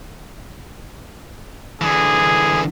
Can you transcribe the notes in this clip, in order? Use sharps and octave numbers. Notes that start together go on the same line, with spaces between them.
D3 E3 G#4